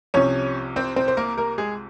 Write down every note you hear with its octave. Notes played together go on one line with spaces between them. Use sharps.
C2 C3 F3 C#4 C#5
C4 C5
C4 C5
C5
A#3 A#4
A#3 A#4
G#3 G#4